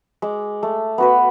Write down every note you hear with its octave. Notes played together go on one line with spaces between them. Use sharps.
G#3 D6
A3
B3 F#4 B4